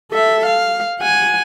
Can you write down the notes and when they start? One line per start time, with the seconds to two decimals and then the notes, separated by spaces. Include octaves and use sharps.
0.11 A4 E5
0.46 F5
1.00 F#5 G#5